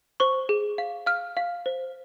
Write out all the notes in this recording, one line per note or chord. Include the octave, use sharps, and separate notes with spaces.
C5 C#6
G#4
F5
F5 F6
F5
C5